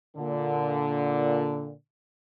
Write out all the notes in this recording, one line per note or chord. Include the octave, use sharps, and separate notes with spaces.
A#2 D3